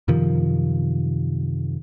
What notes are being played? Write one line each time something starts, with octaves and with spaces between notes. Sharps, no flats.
F#2 C3 D#3 F3